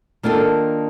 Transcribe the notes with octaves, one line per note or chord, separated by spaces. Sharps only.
D#3 A#3 D4 F4 A4